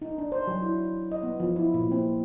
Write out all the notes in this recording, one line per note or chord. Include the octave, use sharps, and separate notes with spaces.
D#4
D4
C5
F#3
E4
D#5
B3
F3
E4
A#2
C4